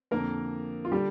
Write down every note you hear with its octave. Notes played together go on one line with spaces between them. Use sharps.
F2 D3 A#3 A#4
F4
D3 G3 G4